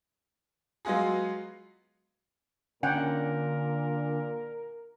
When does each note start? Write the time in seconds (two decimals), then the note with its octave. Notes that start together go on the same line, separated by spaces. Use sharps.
0.85 F#3 G#3 B3 F4 F#4 G#4
2.83 A#2 D3 C#4 A#4 F#5 G5